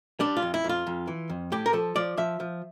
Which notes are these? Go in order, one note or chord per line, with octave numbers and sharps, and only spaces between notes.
G3 D4
F4
F2
E4
F2
F4
F2
E3
F2
A2 G4
A#4
F3 A4
F3 D5
F3 E5
F3